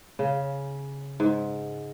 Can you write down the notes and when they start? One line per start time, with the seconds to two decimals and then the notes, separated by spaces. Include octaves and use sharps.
0.19 C#3
1.20 G#2